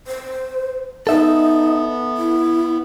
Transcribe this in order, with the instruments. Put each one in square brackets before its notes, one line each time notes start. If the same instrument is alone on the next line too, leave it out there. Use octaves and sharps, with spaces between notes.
[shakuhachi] C5
[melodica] B3 [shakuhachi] D#4 [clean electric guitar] A4 E5
[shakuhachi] E4